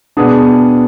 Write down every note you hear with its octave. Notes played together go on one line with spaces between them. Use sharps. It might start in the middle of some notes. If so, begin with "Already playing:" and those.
B2 B3 D4 G#4